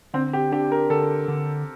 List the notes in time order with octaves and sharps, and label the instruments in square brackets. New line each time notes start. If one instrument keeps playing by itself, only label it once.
[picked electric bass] D3 [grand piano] C4
[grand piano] G4
[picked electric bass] D4 [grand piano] G4
[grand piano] A#4
[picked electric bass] D3 [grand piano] A4
[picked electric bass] D3